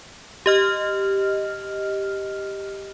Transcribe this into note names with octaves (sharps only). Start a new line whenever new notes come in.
G4 D#5 F6